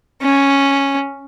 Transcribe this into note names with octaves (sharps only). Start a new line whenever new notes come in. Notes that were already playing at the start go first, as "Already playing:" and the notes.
C#4